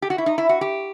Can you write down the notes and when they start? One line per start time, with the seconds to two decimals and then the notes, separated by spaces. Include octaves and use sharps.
0.02 G4
0.10 F#4
0.18 E4
0.26 D#4
0.38 E4
0.49 F#4
0.61 G4